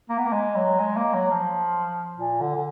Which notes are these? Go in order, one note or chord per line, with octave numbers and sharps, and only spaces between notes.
A#3
B3
A#3
G#3
F#3
G#3
A#3
F#3
F3
A#2
D3
D3